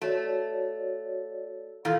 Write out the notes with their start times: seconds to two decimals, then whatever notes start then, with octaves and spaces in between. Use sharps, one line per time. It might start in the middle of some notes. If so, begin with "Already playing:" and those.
0.02 A3 F#4 C#5 D5
1.85 A#2 E3 F4 A4